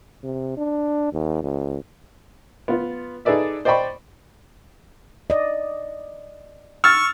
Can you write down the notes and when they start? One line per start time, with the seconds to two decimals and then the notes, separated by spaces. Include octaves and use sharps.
0.24 C3
0.57 D4
1.13 D#2
1.43 C#2
2.68 B3 F4
3.25 D#4 G#4 A4 B4 D5 E5
3.65 C5 D5 D#5 G5 B5 C#6
5.30 D5 D#5
6.84 C#6 E6 F6 A6